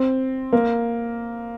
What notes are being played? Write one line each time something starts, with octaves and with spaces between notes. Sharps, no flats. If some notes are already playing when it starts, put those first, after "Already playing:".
Already playing: C4
A#3